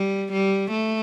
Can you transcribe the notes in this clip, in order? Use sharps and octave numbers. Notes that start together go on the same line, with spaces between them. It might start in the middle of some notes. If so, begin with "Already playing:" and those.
Already playing: G3
G3
A3